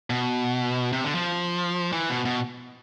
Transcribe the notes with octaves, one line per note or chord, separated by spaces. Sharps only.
B2
C3
D3
F3
E3
B2
B2